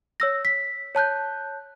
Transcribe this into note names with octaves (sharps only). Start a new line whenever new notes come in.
C#5 E6 A#6
B6
C#5 A5 F#6 G6